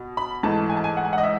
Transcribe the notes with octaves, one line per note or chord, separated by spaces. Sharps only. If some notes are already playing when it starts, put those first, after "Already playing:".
Already playing: B2
B5
G#2 E3 A3 A5
G#5
A5
G#5
F#5
G#5
F#5
D#5
E5